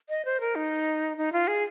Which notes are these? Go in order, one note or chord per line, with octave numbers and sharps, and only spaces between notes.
D#5
C5
A#4
D#4
D#4
F4
G#4